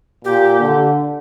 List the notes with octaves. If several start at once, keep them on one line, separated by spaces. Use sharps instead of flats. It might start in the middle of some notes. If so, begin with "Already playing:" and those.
A#2 G4
D3